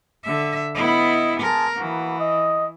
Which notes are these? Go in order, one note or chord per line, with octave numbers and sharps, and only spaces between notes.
D3 E5
B3 E4 D#5
G#3 A#4 G#5 A5
E3 A#3 B3 F#4
D#5